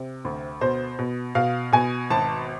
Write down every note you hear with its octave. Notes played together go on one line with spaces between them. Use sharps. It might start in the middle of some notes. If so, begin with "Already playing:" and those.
Already playing: C3
D2
B2 C5
B2
B2 F5
B2 G#5
G#1 A5